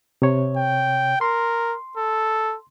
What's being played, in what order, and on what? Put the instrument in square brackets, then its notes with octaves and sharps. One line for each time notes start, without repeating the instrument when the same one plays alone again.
[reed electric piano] C3 C#5
[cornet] G5
[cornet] A#4 [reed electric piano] C6
[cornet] A4